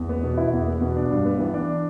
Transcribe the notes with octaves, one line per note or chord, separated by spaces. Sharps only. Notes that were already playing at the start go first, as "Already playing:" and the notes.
Already playing: E2
B3
B2
E4
E2
B3
B2
D4
G2
B3
E3
D4